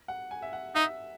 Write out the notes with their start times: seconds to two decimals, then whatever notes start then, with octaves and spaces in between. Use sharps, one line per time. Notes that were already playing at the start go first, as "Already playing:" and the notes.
0.08 F#5
0.31 G#5
0.42 E5
0.53 F#5
0.75 D#4 E5